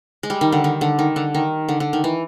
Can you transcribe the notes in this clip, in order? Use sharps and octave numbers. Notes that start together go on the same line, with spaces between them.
G#3
G3
D#3
D3
D#3
D3
D#3
D3
D#3
D3
D3
D#3
E3